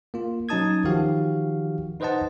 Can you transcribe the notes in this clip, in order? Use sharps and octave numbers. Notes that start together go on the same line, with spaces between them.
A#3 F4
F#3 C#4 D#4 A5 D#6 G#6
D#3 F3 F#4 G4 F5
D#4 B4 C5 D#5 F#5 A5